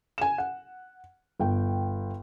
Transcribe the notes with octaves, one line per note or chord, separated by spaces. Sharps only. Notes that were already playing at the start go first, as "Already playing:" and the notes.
G#5 E7
F#5
G1 G5